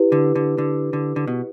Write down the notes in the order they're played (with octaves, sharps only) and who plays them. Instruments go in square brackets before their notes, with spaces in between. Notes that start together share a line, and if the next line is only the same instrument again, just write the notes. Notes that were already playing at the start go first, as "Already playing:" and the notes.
Already playing: [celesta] E4 G4 B4
[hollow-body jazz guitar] D3
D3
D3
D3
D3
B2